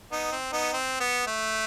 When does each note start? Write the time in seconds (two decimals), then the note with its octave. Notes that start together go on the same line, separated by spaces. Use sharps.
0.11 B3 D#4
0.32 C4
0.52 B3 D#4
0.73 C4
1.00 B3
1.27 A3